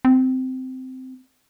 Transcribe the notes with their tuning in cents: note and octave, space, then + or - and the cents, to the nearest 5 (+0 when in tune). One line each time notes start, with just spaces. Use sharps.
C4 -15